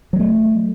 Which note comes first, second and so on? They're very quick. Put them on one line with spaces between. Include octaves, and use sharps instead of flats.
F#3 G3 A3